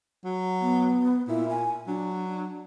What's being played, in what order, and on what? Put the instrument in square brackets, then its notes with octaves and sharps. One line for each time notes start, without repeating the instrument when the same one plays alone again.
[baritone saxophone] F#3
[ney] B3
[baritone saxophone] A#2 [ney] E4
[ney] G#5
[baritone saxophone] F#3 [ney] D4